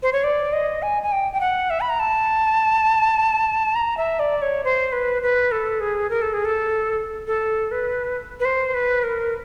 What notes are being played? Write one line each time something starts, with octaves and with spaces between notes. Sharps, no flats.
C5
C#5
D5
D#5
G#5
G#5
G5
G5
F#5
E5
B5
A#5
A5
A#5
E5
D5
C#5
C5
B4
B4
A4
G#4
A#4
A4
G#4
A4
A4
B4
B4
C5
B4
A#4